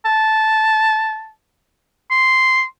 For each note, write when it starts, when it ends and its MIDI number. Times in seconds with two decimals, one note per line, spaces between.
0.05 1.30 81
2.11 2.64 84